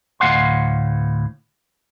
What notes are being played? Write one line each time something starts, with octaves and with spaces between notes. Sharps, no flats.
D2 A2 A3 F5 F#5 C6